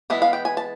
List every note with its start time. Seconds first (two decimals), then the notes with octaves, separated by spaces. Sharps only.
0.10 E3 G#3 B3 E4
0.22 F5
0.33 G5
0.45 G#5
0.57 A5